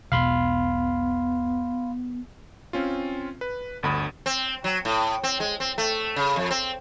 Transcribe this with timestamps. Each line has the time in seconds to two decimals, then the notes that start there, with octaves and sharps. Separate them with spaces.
0.12 E1 B1 B2 B3 F5 B5 C6
2.73 C4 C#4 F4
3.41 B4
3.83 G1 D2 B5 D#6
4.26 C4
4.64 F#3
4.85 A2
5.23 C4
5.40 G#3
5.60 C4
5.78 A3
6.16 C#3
6.36 F2
6.51 C4